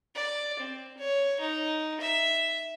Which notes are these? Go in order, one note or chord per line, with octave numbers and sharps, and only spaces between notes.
D5
C4
C#5
D#4
E5